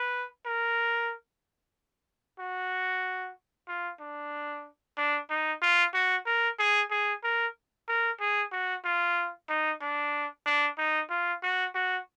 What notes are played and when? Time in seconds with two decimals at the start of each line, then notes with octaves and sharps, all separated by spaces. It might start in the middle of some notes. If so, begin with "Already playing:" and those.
Already playing: B4
0.46 A#4
2.40 F#4
3.68 F4
4.00 D4
4.98 D4
5.30 D#4
5.62 F4
5.94 F#4
6.26 A#4
6.59 G#4
6.91 G#4
7.24 A#4
7.88 A#4
8.20 G#4
8.52 F#4
8.85 F4
9.49 D#4
9.81 D4
10.46 D4
10.78 D#4
11.10 F4
11.43 F#4
11.75 F#4